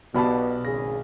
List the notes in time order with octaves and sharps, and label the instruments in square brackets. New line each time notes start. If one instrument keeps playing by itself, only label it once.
[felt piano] B1 D5 B5 [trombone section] B2 [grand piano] B3 G4 A5
[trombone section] G#1 C#3 G#4 [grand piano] A#6